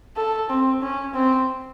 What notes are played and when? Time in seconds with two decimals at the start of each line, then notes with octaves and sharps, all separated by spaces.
0.16 A4
0.49 C4
0.82 C#4
1.14 C4